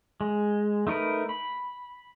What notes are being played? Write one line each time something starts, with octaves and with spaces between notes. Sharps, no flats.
G#3
A3 D#4 A#4 B4
B5